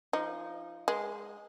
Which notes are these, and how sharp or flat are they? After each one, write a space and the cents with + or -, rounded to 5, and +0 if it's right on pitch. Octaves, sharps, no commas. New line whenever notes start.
F3 -20 D#4 +0
G#3 -5 B4 -35